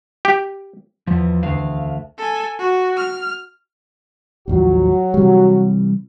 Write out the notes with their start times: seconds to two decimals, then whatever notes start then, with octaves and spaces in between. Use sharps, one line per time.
0.25 G4
1.07 E2 F3
1.43 D2 F5
2.18 A4 G#5
2.58 F#4
2.97 F6
4.48 A1 D#2 F3 F#3 F#4
5.14 C3 E3 G3